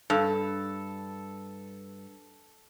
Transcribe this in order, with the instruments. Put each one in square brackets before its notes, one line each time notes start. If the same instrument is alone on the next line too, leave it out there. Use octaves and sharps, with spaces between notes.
[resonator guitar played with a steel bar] G2 [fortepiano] A4